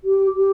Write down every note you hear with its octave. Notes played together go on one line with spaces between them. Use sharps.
G4
G4